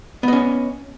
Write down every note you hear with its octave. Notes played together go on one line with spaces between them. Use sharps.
B3 C#4 D#5